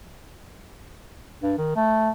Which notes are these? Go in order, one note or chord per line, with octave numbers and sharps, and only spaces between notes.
G2
D#3
A3